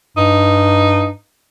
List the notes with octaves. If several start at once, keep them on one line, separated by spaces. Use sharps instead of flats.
G2 D#4